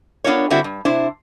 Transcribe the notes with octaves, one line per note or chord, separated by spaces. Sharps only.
B3 D4 F4 A#4 C#5
G2 D3 C4 E4 F#4
G2
C3 D4 E4 C5